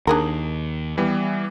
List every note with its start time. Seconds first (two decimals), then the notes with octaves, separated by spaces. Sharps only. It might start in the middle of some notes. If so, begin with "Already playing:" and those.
0.07 D#2 D4 G#4 A#4
0.98 E3 G3 B3